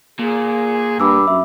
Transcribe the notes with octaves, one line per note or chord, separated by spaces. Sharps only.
A#2 G#4
G2 B5 D6 E6
F#2 E5